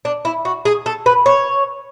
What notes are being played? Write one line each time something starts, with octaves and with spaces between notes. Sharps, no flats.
D4
E4
F#4
G#4
A4
B4
C#5